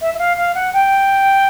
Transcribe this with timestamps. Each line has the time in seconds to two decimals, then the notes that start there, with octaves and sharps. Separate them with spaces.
0.01 E5
0.14 E5
0.18 F5
0.37 F5
0.54 F#5
0.73 G5